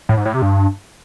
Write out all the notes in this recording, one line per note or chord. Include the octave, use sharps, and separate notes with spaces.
A2
G#2
A2
C3
G2